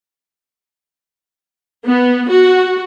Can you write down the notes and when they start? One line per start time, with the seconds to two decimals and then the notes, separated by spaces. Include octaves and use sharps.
1.86 B3
2.30 F#4